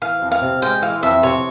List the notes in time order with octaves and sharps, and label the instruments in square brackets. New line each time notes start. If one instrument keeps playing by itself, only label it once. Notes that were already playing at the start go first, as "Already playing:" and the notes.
[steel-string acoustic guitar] E3 [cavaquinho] F5
[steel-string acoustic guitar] F2
[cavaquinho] F5
[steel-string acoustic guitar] C3
[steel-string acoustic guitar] G#3 [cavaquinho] G5
[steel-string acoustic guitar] E3 [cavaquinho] F5
[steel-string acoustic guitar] F2 [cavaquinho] E5
[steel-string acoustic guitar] C3 [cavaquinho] C#5